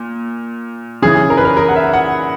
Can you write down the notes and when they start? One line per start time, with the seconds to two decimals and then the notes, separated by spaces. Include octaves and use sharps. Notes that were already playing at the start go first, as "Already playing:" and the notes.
Already playing: A#2
1.02 C#3 E3 G#4
1.30 A#4
1.37 B4
1.45 A#4
1.57 A#4
1.69 F#5
1.76 E5
1.93 F#5